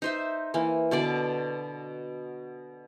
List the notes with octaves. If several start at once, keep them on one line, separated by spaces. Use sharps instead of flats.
D#4 C5 E5
E3 A#3
B2 D3 D5